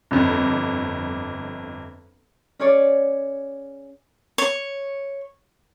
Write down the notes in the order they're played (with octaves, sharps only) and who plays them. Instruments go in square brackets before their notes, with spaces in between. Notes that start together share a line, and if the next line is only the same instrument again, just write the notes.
[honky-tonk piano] G1 F2
[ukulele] C#4 G#4 C#5 D5
[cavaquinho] C#5